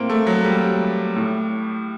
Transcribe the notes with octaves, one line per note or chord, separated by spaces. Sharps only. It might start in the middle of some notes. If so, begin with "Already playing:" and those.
Already playing: A2 A#3 C4
A3
F#3
G3
A2